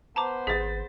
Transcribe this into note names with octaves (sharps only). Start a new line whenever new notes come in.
B3 C5 A5 A#5 D6
G#1 G#4 A6 B6